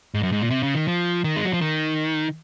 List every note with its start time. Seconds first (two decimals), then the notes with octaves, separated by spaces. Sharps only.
0.14 G#2
0.23 F#2
0.32 G#2
0.41 A#2
0.50 C3
0.63 C#3
0.75 D#3
0.88 F3
1.24 D#3
1.36 G#3
1.45 F#3
1.53 F3
1.61 D#3